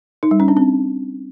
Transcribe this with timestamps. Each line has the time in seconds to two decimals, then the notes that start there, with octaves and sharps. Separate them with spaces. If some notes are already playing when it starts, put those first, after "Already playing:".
0.23 D#4
0.31 G3
0.40 C#4
0.48 D4
0.57 C4